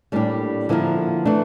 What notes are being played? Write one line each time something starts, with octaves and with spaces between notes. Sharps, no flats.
A2 G3 A#3 D4 G4
D3 F3 A#3 E4 A#4
E3 A3 D4